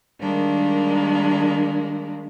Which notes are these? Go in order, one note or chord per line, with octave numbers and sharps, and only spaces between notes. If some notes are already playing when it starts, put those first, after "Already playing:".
D#3 G3 G#3 A#3 D4